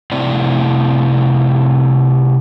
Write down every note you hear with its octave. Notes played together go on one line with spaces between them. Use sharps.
C3 A3 C4 E4 D5